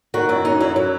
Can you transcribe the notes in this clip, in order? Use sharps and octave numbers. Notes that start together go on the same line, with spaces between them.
D#3 F#4
F#2 E4
F#3 D#4
F#2 E4
F#3 E4